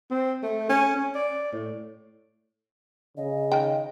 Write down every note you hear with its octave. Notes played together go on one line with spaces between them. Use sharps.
C4
A3
C#4
C#4
D5
A2
C#3 D#5
D#3 G5